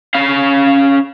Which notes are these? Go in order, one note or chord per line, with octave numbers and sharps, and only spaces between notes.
C#4 F5